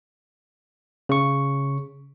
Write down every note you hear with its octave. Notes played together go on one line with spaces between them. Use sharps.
C#3 C#6